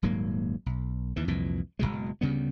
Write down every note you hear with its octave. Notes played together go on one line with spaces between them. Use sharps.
D#1 G#2 F#3 A#3
B1
D#2 E3
C2 F2 A#2 E3
F#1 D#2 B2 G#3
D2 C#3 G3 B3